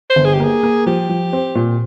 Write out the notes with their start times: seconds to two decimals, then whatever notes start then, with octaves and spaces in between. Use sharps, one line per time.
0.10 C5
0.16 G1
0.25 G#4
0.34 G4
0.40 A#3 G#4
0.63 A#3
0.86 F3 G4
1.09 F3
1.33 C4
1.55 A#2